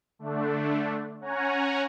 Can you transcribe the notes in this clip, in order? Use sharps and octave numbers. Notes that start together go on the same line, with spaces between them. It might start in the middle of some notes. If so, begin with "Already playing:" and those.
D3 A3 D4
C#4 C#5 F#5 G#5 A#5